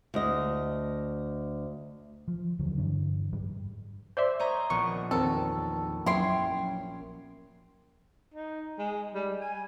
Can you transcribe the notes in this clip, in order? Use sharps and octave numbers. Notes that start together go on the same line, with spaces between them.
D2 D#5
F3
F1 D#2 D3 F#3
G2 D3 E3 D4
G#2 G3
C5 D5 E5 C6
C#5 D#5 A#5
A#1 B3 C#6
E2 D#3 C4 A4 A#4
F#3 C#4 E4 G5 C6
D#4
G#3
G3
G#5